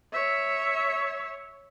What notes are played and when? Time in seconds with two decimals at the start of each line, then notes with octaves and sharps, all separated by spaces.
0.13 C#5 E5